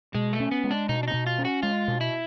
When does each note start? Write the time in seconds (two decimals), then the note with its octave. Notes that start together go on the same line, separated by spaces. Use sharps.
0.15 B2 G#3
0.33 A3
0.40 C#4
0.51 B3
0.64 G#3
0.71 D4
0.89 B2 D#4
1.03 D4
1.08 D#4
1.14 B2
1.27 F4
1.39 C#4
1.45 F#4
1.63 G#3 F4
1.88 B2
2.01 E4